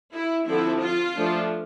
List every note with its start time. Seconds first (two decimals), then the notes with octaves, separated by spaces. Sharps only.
0.13 E4
0.47 D3 F3 C4 E4
0.81 F4
1.15 F3 A3 D4